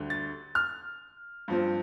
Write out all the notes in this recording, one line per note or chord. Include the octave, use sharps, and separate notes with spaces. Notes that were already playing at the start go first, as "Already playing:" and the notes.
Already playing: D2 D3 G3
A6
F6
G2 F3 C4